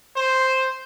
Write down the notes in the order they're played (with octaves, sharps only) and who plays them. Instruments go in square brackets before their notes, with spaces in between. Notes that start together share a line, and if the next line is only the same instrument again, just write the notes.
[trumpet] C5